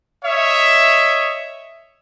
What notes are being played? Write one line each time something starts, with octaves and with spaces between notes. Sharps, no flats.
C#5 D#5 E5